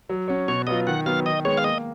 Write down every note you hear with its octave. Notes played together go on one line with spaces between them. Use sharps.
F#3
C#4 F#4 C#5
B2 C#5
F#3 B3 F4 D#5
D#3 F#5
F#3 B3 F5
D#3 D#5
G#3 B3 C#5
F5
A#3 D#5